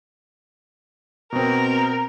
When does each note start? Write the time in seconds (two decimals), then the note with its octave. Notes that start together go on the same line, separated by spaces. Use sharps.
1.33 B2 C4 A#4